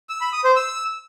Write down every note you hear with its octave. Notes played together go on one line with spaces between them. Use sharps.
E6
B5
D#6
C5
E6